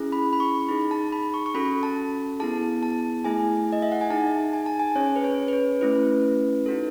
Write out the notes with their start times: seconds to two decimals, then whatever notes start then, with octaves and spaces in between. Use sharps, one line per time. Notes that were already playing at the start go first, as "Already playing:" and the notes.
Already playing: C#4 E4 G#4
0.12 B5
0.33 B5
0.40 C#6
0.69 D#4 G#4 B5
0.91 A5
1.12 B5
1.34 C#6
1.46 C#6
1.54 C#4 F#4 A4 B5
1.83 A5
2.40 B3 E4 G#4 A5
2.83 A5
3.24 A3 E4 G#4 G#5
3.72 D#5
3.82 E5
3.92 F#5
4.01 G#5
4.10 D#4 G#4 A5
4.53 G#5
4.66 A5
4.80 G#5
4.95 C#4 G#4 C#5
5.16 B4
5.24 C#5
5.48 B4
5.53 C#5
5.81 A3 C#4 E4 B4
6.66 D#4 F#4 A4